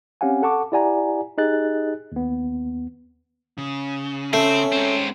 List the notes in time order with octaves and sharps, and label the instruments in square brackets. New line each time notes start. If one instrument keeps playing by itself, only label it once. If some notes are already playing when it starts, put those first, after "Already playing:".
[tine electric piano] C4 C#4 G4 F5 F#5 G#5
A4 F#5 A5 C#6 D6
E4 G4 D5 F#5 G#5 A#5
D#4 G4 G#4 D#5 F#6 A6
D#2 B3
[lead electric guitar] C#3
[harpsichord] A3 [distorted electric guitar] C4 [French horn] C#4
[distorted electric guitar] G#2 C4